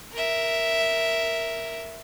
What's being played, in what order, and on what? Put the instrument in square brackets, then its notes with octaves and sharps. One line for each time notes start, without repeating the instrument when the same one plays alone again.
[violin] A#4 E5